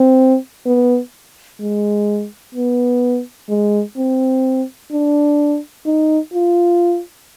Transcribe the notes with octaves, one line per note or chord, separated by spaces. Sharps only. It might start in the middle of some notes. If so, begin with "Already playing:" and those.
Already playing: C4
B3
G#3
B3
G#3
C4
D4
D#4
F4